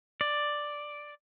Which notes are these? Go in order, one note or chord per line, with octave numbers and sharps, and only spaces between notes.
D5